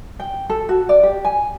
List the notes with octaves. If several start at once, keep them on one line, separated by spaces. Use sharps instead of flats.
G5
A4
F#4
D5
G4
G#5